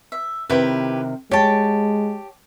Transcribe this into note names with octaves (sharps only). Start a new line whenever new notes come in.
E5
C3 D#3 E4 G4 B4
G#3 G4 C#5 G5 A5